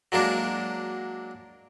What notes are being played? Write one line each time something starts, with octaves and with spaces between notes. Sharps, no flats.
F#3 G#3 A#3 D4